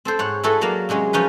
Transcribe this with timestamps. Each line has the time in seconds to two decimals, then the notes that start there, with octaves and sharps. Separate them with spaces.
0.05 C4 A4 C5
0.19 G#2 C#5 F#5
0.44 E4 F#4 G#4 A4 B4 C#5
0.61 F#3 A#3 D5 F5 A#5
0.89 C3 F#3 G#3 C#4
1.13 F3 C#4 D#4 B4